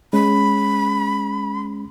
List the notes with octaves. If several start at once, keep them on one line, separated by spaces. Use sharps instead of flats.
G#3 C#4 B5